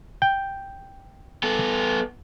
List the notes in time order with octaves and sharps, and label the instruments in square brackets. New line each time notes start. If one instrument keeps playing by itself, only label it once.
[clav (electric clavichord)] G5
[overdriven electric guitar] B3 A4